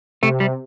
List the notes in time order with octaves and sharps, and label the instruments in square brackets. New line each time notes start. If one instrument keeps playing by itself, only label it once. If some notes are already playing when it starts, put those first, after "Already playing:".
[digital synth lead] C3 [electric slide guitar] A3
[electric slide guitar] G3